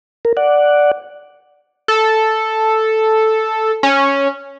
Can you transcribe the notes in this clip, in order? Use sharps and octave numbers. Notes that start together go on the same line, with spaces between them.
A#4
D5 F#5
A4
C#4